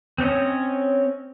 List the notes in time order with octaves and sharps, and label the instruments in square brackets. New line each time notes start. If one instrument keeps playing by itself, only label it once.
[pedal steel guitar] C4 C#4 C#5 D#5